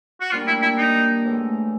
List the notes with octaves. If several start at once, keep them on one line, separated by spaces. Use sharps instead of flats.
F#4
A#2 G3 A#3 D4 F4
E4
E4
D#4
A2 E3 G#3